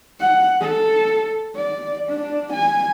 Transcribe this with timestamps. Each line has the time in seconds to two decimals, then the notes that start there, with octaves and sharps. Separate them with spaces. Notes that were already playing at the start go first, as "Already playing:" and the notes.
0.20 F#5
0.61 A4
1.55 D5
2.09 D4
2.53 G#5